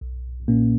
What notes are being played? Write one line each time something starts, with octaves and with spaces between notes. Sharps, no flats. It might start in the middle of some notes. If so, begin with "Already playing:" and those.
B1
A#2 A#3 C#4